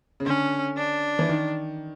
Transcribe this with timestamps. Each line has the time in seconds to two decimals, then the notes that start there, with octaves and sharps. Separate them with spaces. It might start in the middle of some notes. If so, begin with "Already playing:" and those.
0.20 C#3
0.26 D3 C#4
0.77 D4
1.19 E3
1.29 D#3